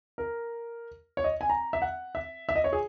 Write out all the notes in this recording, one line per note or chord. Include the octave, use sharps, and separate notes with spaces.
A#4
C#5
D#5
G#5
A#5
E5
F#5
E5
E5
D#5
C#5
G#4